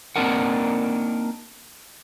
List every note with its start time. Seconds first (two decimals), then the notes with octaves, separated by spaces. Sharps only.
0.16 A#3 C4 D4 D#4 A#4 F#5